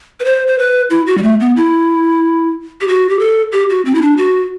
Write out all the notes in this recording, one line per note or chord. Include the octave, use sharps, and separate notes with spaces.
B4
C5
C5
B4
E4
F#4
G3
A3
B3
E4
G4
F#4
G4
A4
G4
F#4
C4
E4
D4
F#4